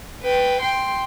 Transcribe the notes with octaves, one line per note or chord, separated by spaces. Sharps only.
B4 G5
G5 C6